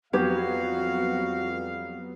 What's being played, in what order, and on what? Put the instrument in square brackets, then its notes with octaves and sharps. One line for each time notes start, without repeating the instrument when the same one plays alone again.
[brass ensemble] F2 G3 F5 [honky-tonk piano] F#3 B3 G#6 [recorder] F#4 [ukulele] G4